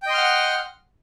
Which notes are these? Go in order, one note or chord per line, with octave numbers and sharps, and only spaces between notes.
D#5 F#5 G5 C6 F6